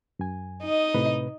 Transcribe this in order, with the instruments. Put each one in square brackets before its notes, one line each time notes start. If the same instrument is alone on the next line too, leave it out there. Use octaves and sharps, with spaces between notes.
[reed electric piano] F#2 G#5
[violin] D#4 D#5
[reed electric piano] A2 C3 B4